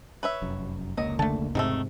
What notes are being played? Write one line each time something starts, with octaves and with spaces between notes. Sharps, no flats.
B4 C#5 E5
F1 F#2
F1 C#2 F#3 A#3 D#5
D3 A3 A5
E1 G#2 C3 D#3 G3 A3 C4